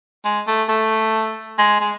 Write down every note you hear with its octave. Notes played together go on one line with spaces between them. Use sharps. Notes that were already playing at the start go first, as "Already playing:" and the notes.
G#3
A3
A3
G#3
G#3